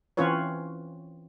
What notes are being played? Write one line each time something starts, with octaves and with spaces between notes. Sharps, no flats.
E3 C4 C#4 F4 B4 C#5